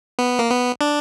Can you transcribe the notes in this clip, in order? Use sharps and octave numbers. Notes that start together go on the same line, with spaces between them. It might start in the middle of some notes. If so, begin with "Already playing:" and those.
B3
A#3
B3
D4